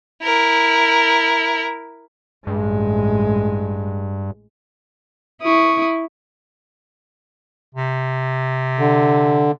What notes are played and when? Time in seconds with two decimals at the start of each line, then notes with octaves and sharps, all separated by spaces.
0.24 E4 A#4
2.47 A1 G2 G#3
5.42 E4 C#6 D#6
7.75 C3
8.78 D3